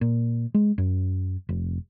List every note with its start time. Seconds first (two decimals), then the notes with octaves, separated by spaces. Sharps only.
0.01 A#2
0.54 G#3
0.78 F#2
1.49 F1